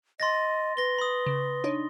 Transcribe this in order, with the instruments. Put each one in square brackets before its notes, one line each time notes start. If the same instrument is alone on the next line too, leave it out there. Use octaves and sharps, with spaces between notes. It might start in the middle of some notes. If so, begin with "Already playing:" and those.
[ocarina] D#5 [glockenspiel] C6 A6 A#6
[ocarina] B4 [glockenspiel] A#6 G7
[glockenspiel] B5 D#6
[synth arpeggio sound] C#3
D4 D#4 C#5